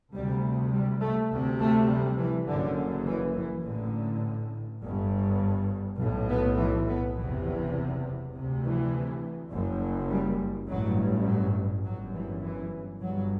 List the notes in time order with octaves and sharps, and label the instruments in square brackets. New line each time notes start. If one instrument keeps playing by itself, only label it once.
[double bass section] D2 C3 G3
G3
A3
D2 C3
A3
G3
E3
F#1 F#2 D3
E3
E3
A1 A2 D3
G1 G2
B1 A2
B3
E3
B3
F#1 E2 C3 E3
E3
D2 C3
E3
F#1 F#2
G3
A1 G2 F#3
F#3
G1 F#2 F#3
E3
E3
G1 G2 F#3